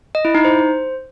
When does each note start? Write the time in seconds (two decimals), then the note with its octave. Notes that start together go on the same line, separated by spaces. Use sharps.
0.15 D#5
0.25 E4
0.35 D#4
0.45 C5